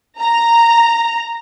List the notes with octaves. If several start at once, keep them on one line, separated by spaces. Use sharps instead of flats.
A#5